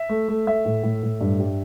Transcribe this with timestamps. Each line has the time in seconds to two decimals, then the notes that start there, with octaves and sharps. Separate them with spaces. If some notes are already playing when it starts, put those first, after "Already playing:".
Already playing: E5
0.09 A3
0.28 A3
0.47 A3 E5
0.65 A2
0.83 A2
1.03 A2
1.21 G2
1.40 G3